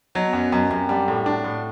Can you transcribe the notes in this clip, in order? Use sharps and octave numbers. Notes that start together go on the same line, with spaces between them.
B2 F#3
F#2
F#2 B2
F#2 C3
D3 G3
A2
D4
A2